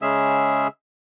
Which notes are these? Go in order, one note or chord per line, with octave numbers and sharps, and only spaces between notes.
C#3 G#3 C#4 G#4 E5 E6